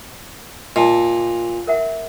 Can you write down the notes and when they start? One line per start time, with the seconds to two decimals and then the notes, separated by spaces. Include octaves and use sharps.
0.76 A#2 D#5 A5
1.67 A#4 E5 F#5